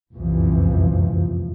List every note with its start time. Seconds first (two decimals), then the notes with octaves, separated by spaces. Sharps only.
0.15 F1 C2 F#2 A#2 E3 F3